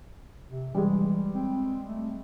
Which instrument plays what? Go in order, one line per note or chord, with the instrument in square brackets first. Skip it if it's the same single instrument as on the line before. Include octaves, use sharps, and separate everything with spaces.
[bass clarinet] C3
[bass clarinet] E3 [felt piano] G3 G#3
[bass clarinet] C4
A3